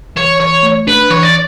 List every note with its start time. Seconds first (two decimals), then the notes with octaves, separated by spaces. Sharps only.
0.16 E3 C#5
0.40 E3 C#5
0.63 A3
0.87 D4 B4
1.10 E3 C#5
1.23 D5